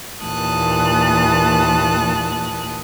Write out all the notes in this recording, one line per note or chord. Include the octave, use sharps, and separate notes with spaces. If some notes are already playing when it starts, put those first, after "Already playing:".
D#2 A#2 E3 A5 D#6 F#6